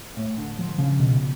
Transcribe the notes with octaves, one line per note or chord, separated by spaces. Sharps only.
A2
D3
F3
C#3
B2